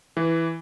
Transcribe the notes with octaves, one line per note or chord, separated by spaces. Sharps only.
E3